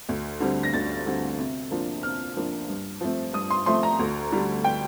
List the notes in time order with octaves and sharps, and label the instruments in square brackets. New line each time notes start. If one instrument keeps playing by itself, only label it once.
[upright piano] D2
D3 G3 C4
A#6
D2 A6
D3 G3 C4
C3
F3 A#3 D4
C3 F6
F3 A#3 D4
G2
F3 A3 C4
G2 D#6
C6
F3 A3 C4 C6
A#5
D2
D3 G3 D4
G5